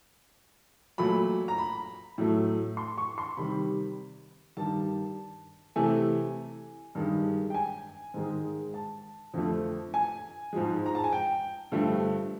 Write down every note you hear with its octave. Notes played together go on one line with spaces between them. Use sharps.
A#2 F#3 A3 B5
A#5
B5
A2 F#3 A3
C6
C#6
C6
C3 D#3 G3 B5
G2 D#3 G3 A5
C3 E3 A3 G#5
G2 D#3 G#3
G5
G#5
G#2 D#3 G#3
A5
F2 D3 F3 A3
G#5
G#2 F3 G#3
A#5
A5
G#5
G5
G2 D3 F3 A3